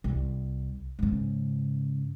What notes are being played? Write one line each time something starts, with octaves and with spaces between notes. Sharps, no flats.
C2
G#2 C#3